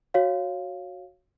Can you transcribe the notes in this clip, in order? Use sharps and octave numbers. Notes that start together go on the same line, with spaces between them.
F#4 C#5 F5